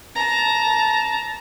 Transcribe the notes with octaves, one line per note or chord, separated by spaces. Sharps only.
A5 A#5